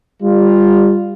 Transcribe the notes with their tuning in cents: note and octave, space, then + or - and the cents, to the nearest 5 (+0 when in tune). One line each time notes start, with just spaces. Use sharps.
G3 +25 F4 +0